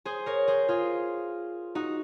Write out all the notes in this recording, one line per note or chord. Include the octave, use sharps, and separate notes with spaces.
G#4 C5
A#4 C#5
G#4 C5
F4 G#4
D#4 F#4